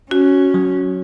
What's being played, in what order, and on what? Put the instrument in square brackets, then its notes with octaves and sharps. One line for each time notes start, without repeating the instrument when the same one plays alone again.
[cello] C#4 [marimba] F#4
[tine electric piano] F#3